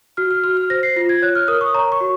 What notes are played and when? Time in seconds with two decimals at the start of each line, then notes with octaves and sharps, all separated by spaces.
0.17 F#4 F6
0.31 F6
0.44 F#4 F6
0.57 F6
0.70 C5 A#6
0.83 C7
0.96 F4 A#6
1.09 G#6
1.22 C#5 F#6
1.35 F6
1.48 A#4 D#6
1.61 C#6
1.74 C#5 A#5
1.92 C#6
2.00 F#4